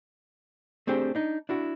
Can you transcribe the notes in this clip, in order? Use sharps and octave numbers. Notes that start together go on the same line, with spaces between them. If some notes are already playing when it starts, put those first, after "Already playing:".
A3 C4 D4 G4 G#4
D4 D#4
D4 E4 F#4